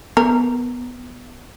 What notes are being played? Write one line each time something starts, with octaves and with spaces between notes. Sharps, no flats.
B3 A#4